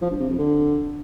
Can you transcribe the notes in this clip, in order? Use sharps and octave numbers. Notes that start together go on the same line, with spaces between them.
F3
G2
C3
F2
D3